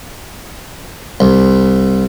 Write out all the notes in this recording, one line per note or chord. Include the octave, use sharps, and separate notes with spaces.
C2